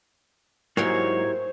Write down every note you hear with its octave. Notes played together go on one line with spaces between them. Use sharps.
G#2 F#3 A#3 E4 G4 A#4 C5 C#5